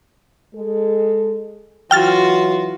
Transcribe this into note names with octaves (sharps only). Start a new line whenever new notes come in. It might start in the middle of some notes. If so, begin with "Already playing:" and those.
G#3 A4
E3 F#3 F4 F#4 G5 F6 A6